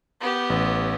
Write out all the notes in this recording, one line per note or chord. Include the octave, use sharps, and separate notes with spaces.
B3 G4
A1